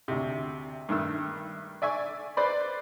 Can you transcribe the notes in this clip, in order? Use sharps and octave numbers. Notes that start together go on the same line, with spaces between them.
D2 C3
G2 D#3 A3 E6
D5 E5 G#5 C#6
B4 C5 D5 B5 C6